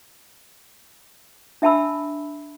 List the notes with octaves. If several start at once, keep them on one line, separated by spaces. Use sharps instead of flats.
D4 E5 G5 A5 B5 E6